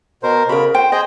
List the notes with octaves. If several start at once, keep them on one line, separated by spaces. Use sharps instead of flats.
B2 A#4 C5
C#3 F#4 A#4 B5
C5 G5
G#4 C5 D#5 G5